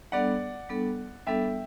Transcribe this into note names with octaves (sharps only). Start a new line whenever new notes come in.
G3 B3 D4 A4 D5 F#5
G3 B3 D4 A4
G3 B3 D4 A4 E5 G5